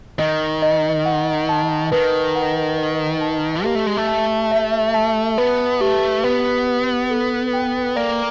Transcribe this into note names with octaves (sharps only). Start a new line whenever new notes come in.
D#3 D#5
D#5
F#5
A5
D#3 B4
F#5
D#5
A5
A#3 G4
A3
G#3
A3
A5
E5
A5
B3 B4
A3 G4
B3 B4
B4
A4
G5
A#3 D5